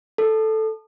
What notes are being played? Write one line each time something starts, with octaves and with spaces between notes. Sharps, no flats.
A4